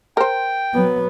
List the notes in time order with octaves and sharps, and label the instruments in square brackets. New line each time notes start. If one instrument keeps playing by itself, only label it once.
[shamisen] A#4 C5 [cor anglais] G5
[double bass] F#3 B3